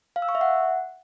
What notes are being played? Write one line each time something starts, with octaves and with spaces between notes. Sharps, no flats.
F5
E6
C#6
E5
F#5